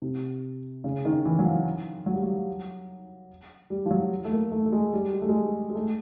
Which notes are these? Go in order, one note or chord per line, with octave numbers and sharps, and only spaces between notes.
C3
C#3
D#3
E3
F#3
F3
F#3
G3
F#3
G3
F3
F#3
A3
A#3
A3
A3
G#3
G3
G#3
A3
G#3
G#3
A3